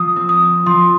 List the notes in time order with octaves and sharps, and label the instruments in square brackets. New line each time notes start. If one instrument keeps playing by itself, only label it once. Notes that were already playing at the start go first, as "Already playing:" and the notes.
Already playing: [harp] F3 [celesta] D#6
[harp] C4
[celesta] D#6
[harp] C4
[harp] F3 [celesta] C6